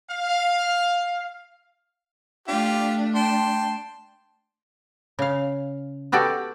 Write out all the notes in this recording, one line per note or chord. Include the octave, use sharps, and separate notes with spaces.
F5
A3 D4 F4 G4
G5 A5 C6
C#3 F5
B3 F#4 G4 A4 D5